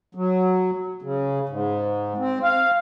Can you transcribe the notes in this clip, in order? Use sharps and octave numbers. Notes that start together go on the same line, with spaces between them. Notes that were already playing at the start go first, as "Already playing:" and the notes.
F#3
C#3
G#2
C4
F5